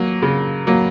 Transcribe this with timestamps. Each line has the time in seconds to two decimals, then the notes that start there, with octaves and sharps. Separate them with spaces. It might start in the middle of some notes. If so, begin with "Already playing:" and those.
Already playing: F#3 A#3
0.22 C#3
0.67 F#3 A#3